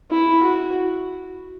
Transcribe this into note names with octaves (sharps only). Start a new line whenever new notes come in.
E4
F#4